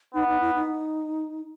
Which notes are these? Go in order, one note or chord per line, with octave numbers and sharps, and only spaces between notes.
B3 D#4
D#4
E4
D#4